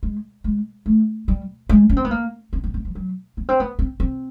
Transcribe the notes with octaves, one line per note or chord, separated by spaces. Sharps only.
G#3
G#3
A3
G3
G#3
C#4
C4
B3
A#3
C4
B3
B3
F3
F#3
B3
C4
B3
C4
C4